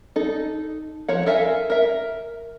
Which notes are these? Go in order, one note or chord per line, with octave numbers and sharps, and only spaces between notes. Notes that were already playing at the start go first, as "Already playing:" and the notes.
D#4 A4
F3 C#5 F#5
A4 A#4 E5 F5 G#5
A#4 E5